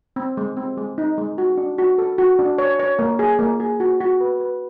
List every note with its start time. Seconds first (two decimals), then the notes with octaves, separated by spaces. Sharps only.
0.16 C4
0.37 G#3
0.57 C4
0.77 G#3
0.98 D#4
1.18 G#3
1.38 F#4
1.58 D4
1.78 F#4
1.98 A4
2.18 F#4
2.39 D4
2.58 C#5
2.79 C#5
2.99 A#3
3.19 G#4
3.39 A#3
3.60 G#4
3.80 F#4
4.01 F#4
4.20 B4
4.40 B4